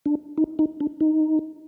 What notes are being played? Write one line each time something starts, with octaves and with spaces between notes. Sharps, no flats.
D4
D#4
D#4
D4
D#4